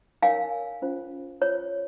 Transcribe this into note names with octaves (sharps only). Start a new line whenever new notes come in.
D#4 A#4 C#5 F5 G#5
C#4 F4 C5
F4 C5 C#5